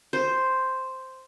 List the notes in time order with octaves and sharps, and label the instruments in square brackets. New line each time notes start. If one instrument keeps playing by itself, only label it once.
[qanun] C5